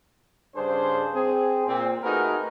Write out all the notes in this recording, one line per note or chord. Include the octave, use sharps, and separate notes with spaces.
G2 C#3 D4 G#4 C5
C4 G#4
A#2 C4
A3 D#4 F#4 G#4 A#4 B4